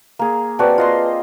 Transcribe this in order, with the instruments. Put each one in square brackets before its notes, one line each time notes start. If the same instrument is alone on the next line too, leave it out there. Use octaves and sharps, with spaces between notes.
[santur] A#3 G#4
[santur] C4 F#4 D5 [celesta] B4 A5
[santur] F4 D#5 C6